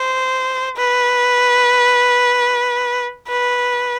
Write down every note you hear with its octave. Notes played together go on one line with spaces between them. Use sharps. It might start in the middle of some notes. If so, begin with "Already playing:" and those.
Already playing: C5
B4
B4